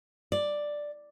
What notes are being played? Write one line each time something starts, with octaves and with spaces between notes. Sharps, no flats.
D5